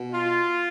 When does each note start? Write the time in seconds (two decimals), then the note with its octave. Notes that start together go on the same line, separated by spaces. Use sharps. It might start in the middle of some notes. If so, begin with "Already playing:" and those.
Already playing: B2
0.12 F4